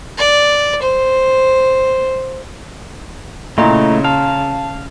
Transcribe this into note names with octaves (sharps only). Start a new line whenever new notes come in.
D5
C5
A#2 C#3 A3 E4 D#5 A#5
F5 A5